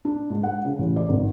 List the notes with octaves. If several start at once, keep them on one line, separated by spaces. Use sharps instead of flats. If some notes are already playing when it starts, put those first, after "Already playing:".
D4
G#2
F#5
C#3
A1
D5
G#1